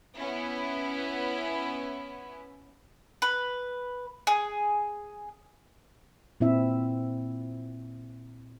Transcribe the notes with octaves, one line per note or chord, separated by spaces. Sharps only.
B3 C#4 E4
B4
G#4
A#2 C4 E4 E5